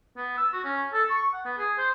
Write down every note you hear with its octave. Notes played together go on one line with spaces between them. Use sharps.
B3
E6
F#4
C#4
A4
C#6
F#5
B3
G#4
C5